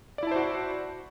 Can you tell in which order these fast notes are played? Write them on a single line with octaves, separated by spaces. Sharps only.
D5 E4 A5 C5 F#4